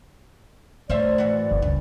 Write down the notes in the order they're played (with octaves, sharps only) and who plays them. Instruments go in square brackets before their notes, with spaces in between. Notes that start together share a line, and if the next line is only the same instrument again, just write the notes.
[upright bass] A2 [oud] C#4 C5 E5 [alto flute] D5
[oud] E3 F#4
[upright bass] F#1
[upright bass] C#2 [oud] G2